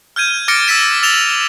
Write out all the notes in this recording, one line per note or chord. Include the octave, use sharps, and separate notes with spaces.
F6 G6 G#6 D#7
D6 F6 A6 A#6 C#7 D7
E6 A6 B6 E7
E6 A6 E7 F7 G7